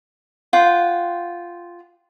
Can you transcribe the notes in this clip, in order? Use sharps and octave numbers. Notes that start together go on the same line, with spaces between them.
F4 F#5 G5